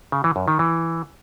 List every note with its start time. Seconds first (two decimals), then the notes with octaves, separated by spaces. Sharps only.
0.12 C#3
0.24 E3
0.36 F#2
0.48 D#3
0.59 E3